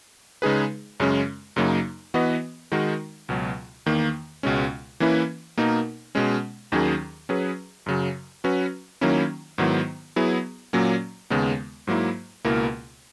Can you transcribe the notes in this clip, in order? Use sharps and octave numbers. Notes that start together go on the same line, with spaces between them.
C#3 G#3 D#4 G#4 B4
F#2 C#3 G#3 C#4
F#2 C#3 F#3 A#3 D#4
E3 B3 F#4 B4 D#5
D#3 G#3 D#4 F#4 A#4
C#2 B2 F#3
E2 D#3 A#3
C#2 B2 G#3 C#4
E3 A#3 C#4 E4 B4
B2 A#3 D#4 A#4
B2 G#3 C#4
D#2 D#3 F#3 C#4 G#4
F#3 C#4 G#4 B4
F#2 C#3 F#3
F#3 C#4 F#4 B4
D#3 F#3 A#3 C#4 E4
G#2 D#3 F#3 B3 E4
F#3 B3 E4 G#4
A#2 F#3 A#3 C#4
D#2 C#3 G#3 B3
G#2 F#3 A#3 E4
C#2 B2 A#3 E4 A#4